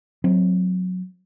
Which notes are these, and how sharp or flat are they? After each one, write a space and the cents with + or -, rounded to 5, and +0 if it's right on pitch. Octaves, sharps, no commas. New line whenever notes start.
F#3 -15 C4 +0